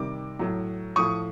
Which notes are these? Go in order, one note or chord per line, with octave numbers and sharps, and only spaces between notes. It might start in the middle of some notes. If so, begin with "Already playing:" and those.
Already playing: C3 D#3 G3 D6
A2 F#3
A2 F3 C#6 D#6